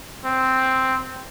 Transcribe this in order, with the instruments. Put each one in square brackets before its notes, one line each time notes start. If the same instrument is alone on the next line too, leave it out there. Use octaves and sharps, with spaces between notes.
[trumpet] C4